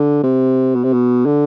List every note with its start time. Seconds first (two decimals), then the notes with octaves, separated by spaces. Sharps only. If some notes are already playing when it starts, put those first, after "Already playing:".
Already playing: D3
0.23 C3
0.75 B2
0.84 C3
0.93 B2
1.26 D3